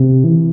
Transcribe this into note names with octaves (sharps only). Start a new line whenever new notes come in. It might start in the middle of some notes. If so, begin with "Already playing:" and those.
Already playing: C3
E3